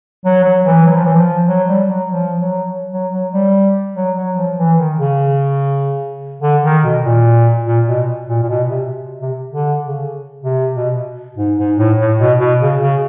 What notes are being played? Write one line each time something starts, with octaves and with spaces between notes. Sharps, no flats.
F#3
F#3
E3
F#3
F3
E3
F3
F#3
G3
F#3
F3
F#3
F#3
F#3
G3
F#3
F#3
F3
E3
D#3
C#3
D3
D#3
B2
A#2
A#2
B2
A#2
A#2
B2
C3
C3
D3
C#3
C3
B2
G#2
G#2
A2
A2
B2
B2
C#3
C#3